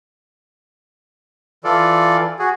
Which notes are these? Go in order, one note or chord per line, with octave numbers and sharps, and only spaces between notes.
E3 F4 A4 D5
F#4 G#4